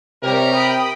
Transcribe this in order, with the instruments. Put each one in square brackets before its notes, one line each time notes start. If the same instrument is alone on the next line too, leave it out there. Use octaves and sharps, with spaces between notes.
[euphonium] C3 [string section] G3 G4 C#5 [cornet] A#4
[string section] G5 B5 D#6